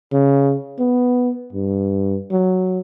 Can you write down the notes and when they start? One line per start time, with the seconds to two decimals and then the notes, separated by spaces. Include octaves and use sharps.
0.12 C#3
0.79 B3
1.53 G2
2.31 F#3